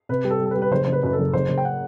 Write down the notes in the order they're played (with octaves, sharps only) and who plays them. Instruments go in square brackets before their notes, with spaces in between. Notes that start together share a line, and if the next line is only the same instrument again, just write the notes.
[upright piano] C3 [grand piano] B4
[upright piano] G3
[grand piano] A4
[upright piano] G3
[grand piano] A4
B4
[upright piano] G3
[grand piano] B4
[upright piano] F#1 [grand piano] C5
[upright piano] F#1 [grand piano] C5
[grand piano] B4
[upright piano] F#2 [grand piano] B4
[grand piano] A4
[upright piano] F#1
[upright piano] F#1 [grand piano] C5
[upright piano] F#1
[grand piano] G5
F#5